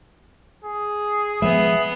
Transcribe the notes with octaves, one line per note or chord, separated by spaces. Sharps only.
G#4
F3 G#3 B3 G#4 E5